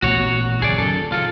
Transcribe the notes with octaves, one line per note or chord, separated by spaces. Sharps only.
A1 A#2 B3 F#4 C#5
F#1 D#2 C#3 G#4 D5
F#2 A#2 D#3 A4
C#3 F4 A4